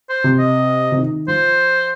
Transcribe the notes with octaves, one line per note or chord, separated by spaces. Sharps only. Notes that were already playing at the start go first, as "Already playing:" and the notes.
C5
C3
D#5
C3
D#3
F3 C5